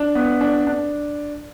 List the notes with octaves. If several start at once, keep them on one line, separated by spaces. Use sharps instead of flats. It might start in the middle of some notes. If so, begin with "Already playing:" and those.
Already playing: D4
B3
D4
D4